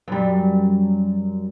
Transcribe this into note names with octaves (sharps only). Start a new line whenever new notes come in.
F#2 G3